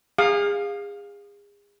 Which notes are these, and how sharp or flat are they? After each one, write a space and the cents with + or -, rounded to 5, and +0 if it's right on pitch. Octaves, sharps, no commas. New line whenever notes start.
G#4 -35 F5 +15 D#6 -35